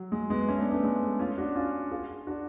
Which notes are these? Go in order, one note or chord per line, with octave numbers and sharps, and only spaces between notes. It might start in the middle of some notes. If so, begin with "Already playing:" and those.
Already playing: F#3
G#3
G#3 B3
A3 C#4
B3 D4
A3 C#4
G#3 B3
C#4 F4
D4 F#4
C#4 F4
F4 G#4
D4 F#4